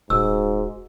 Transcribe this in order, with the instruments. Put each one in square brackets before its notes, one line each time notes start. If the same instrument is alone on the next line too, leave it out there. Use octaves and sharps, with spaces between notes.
[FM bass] D#1 [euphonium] G#2 [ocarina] F#4 [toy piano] E6